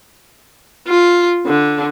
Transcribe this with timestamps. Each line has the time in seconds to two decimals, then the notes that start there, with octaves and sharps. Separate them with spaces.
0.88 F4
1.47 D3